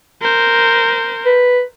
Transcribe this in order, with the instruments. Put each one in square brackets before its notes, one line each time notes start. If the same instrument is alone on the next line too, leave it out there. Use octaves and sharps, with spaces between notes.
[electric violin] A#4 C5
[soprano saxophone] B4